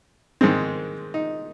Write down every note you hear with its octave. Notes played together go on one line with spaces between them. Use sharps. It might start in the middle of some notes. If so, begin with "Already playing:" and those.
G#2 D#3 G#3 C4
D#4